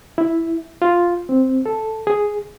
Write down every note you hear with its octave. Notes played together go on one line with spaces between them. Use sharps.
E4
F4
C4
A4
G#4